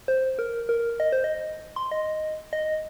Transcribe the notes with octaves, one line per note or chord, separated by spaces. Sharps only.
C5
A#4
A#4
D#5
C5
D#5
C6
D#5
D#5